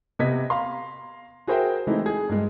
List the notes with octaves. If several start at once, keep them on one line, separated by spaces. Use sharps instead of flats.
C3 B3 D#5 G#6 B6
F5 A#5 C6
F#4 G#4 A#4 C5 E5 G5
E3 G#3 A3 C4 D#4 E4
G#4 G#6
G2 G#3